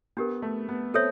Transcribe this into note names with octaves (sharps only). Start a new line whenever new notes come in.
B3 D4 G4 A#4
A3
B3
C4 A4 C#5 E5